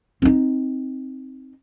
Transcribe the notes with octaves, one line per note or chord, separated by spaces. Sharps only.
C4 D#4